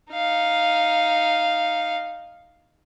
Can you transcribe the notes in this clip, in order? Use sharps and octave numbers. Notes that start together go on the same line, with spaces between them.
D#4 F5